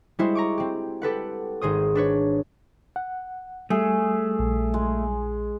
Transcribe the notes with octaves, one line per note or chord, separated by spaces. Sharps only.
G3 G#3 E4 F#4 C5
A#5 C#6 D6
C4 G4
G4 A4 B4 F#5
G#1 G#4 C5 D#6
D4 B4 C#5
F#5
G3 A3 G#4
A#1
G#3